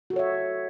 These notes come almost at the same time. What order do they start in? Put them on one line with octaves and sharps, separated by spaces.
F#4 A4 C#5 E5